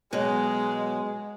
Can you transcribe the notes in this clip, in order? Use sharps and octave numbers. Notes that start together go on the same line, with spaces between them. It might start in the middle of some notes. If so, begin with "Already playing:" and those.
B2 F#3 G#3